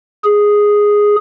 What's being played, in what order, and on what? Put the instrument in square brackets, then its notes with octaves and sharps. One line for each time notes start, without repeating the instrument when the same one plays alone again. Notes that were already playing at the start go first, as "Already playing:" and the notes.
[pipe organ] G#4